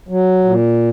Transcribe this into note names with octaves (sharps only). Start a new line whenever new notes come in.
F#3
A#2